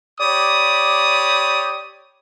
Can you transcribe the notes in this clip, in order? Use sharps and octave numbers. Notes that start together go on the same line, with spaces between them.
G4 C#5 D5 B5 D#6